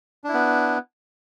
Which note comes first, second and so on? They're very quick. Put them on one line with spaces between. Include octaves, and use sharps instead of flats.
D4 E4 B3